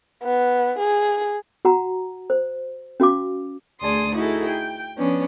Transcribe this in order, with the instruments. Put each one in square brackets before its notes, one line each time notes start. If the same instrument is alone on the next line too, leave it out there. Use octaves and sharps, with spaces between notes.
[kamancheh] B3
G#4
[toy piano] F#4 F#5 A#5
C5
C#4 F#4 F5 D6
[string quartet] D2 G#4 D5 A5 C6 D#6
D#4 E4 F#4 G#4 A4
G5
F3 B3 C#4 D4